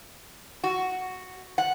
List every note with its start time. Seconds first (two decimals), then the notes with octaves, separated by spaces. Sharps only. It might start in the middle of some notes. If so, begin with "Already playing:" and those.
0.64 F#4
1.58 F#5